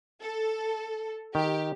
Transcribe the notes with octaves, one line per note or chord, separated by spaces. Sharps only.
A4
D#3 G4